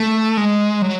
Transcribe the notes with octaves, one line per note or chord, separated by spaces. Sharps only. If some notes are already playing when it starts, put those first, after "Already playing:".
Already playing: A3
G#3
F#3